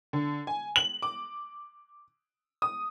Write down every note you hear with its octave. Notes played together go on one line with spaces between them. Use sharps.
D3
G#5
F#7
D6
D#6